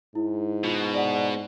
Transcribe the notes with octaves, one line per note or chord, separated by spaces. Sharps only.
G#2 E4
B2 F4
D5 F#5